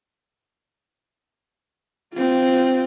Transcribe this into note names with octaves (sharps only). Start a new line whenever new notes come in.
C4 F4